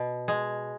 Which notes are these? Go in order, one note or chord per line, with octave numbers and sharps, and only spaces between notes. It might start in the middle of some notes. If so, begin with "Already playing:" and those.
Already playing: B2
G#3